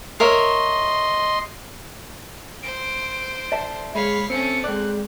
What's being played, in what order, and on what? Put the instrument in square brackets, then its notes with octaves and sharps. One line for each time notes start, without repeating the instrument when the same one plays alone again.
[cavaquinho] A#4 C#5 E5 [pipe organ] D#5 C6
[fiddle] C5 [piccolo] D7
[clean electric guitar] D5 E5 A5
[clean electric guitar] G#3 [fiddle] C#5 F5 [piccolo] B5
[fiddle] A3 C#4 [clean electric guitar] C4 [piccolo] C#7
[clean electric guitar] G#3 D5 [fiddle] C4 [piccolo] F#6